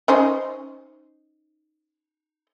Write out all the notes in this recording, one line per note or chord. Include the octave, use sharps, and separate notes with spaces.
C#4 D#4 C5